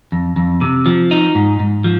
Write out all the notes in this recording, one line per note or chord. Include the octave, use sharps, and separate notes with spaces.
F2
F2
C3
F3
D#4
G#2
G#2
F3